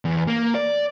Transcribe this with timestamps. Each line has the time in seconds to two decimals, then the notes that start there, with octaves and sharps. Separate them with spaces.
0.05 E2
0.28 A#3
0.55 D5